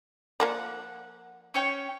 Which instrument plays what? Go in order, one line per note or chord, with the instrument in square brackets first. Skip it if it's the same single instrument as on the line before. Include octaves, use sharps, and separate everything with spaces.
[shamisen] F3 A#3 D5 [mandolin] F#5
[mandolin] C#4 C#5 G5